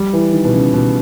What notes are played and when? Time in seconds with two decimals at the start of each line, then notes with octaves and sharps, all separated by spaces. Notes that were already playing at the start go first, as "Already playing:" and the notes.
Already playing: G3
0.13 E3
0.33 D#3
0.45 B2
0.54 C#3
0.74 B2